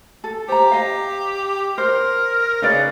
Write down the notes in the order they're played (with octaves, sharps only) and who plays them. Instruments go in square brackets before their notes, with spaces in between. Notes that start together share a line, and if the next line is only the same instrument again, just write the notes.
[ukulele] A4
[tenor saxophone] G4 [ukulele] C5 A#5
[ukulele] D#5 F5
[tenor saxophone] A#4 [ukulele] C5
[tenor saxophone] C#3 [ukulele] D#4 B4 D5